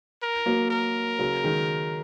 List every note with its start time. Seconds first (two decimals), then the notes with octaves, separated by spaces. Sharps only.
0.22 A#4
0.46 F#3 A#3
0.70 A#4
1.19 C#3 F#3
1.43 D#3 G#3